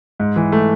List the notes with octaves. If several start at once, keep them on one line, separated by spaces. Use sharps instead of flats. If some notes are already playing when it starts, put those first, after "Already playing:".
G#2
E3
A3